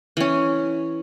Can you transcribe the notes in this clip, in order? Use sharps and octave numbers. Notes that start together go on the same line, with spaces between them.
E3 C#4